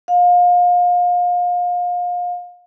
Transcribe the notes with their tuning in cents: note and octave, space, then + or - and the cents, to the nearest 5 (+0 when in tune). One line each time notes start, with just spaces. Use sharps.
F5 +30